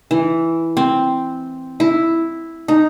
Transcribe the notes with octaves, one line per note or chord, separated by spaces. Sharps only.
E3
C4
E4
D#4